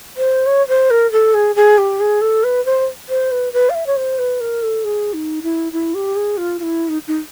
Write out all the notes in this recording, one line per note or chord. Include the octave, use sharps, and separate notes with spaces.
C5
C#5
C5
A#4
A4
G#4
G#4
G4
G#4
A4
B4
C5
C5
B4
B4
F5
E5
C#5
C5
B4
A#4
A4
G#4
D#4
E4
E4
G4
G#4
F4
F4
E4
D#4
D#4